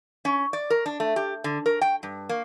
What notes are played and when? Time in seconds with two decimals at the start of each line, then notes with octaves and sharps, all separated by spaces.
0.25 C#4
0.53 D5
0.70 A#4
0.86 D4
1.00 A3
1.16 G4
1.44 D3
1.66 A#4
1.81 G5
2.03 G2
2.29 A#3